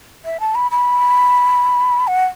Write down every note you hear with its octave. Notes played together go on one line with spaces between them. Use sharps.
E5
A5
B5
B5
F#5